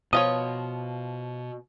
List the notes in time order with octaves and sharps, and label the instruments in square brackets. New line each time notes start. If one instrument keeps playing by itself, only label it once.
[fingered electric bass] B2 [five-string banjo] F3 F4 C#5 [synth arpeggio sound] D#6